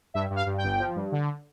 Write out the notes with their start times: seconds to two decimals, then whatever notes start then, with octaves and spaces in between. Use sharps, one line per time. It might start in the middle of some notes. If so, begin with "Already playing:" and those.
0.14 G2 E5
0.30 G2
0.36 F5
0.46 G2
0.58 G5
0.63 G1
0.80 F3
0.96 G2
1.12 D3